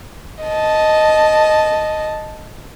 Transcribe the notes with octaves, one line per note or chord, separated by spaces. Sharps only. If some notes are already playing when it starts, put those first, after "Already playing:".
D#5 A5